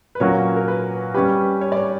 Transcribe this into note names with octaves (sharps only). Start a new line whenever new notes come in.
B4
A#2 F#3 A#3 C#4 F#4 C#5
A#4
B4
G3 C#4 G4 B4
C#5
D5
C#5